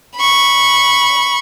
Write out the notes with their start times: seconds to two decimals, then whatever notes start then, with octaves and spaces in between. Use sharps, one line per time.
0.16 B5 C#6